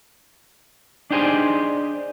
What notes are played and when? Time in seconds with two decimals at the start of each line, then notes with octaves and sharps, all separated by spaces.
1.11 D4 D#4 G4 G#4 C5 G#5